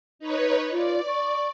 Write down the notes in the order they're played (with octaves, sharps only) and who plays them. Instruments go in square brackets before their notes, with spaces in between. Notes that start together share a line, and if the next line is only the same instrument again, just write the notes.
[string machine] D#4 B4 C#5
[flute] F4 [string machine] D5
[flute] C#6